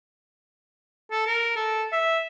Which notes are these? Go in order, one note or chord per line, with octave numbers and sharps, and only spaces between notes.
A4
A#4
A4
E5